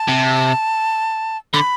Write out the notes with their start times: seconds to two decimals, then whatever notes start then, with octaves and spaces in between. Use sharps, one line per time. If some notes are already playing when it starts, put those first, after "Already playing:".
Already playing: A5
0.08 C3
1.53 D3 B5